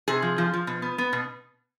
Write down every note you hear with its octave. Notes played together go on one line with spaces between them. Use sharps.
C3 G#4
F3
F3
F3
B2
B3
B3
B2